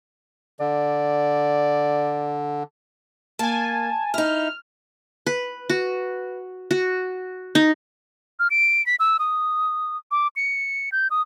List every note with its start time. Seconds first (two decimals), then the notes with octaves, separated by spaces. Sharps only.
0.60 D3 D5
3.39 A#3 G#5 A5
4.14 D#4 E4 F6
5.26 B4
5.69 F#4
6.71 F#4
7.55 D#4
8.39 F6
8.51 D7
8.86 B6
9.00 E6
9.19 D#6
10.11 D6
10.36 C#7
10.92 G6
11.11 D#6